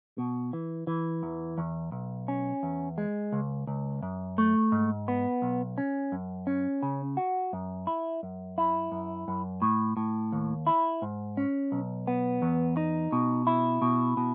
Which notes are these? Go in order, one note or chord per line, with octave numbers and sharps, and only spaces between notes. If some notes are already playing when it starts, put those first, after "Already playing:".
B2
E3
E3
E2
E2
B1
C#4
E2
G#3
C#2
C#2
F#2
A3
G#2
B3
B1
C#4
F#2
C#4
C#3
F#4
F#2
E4
F#2
E4
F#2
F#2
A2
A2
D#2
E4
G#2
C#4
B1
B3
E2
D#4
B2
E4
B2
B2